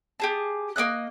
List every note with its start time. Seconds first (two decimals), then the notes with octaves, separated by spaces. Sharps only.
0.20 G4 G#4 A5
0.76 A#3 C#4 D#5 F#6